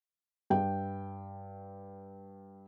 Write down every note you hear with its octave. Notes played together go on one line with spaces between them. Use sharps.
G2 G5